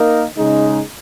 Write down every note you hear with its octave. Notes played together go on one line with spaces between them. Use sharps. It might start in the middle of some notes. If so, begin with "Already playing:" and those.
Already playing: A#3 D#4 A#4
C#3 G#3 D#4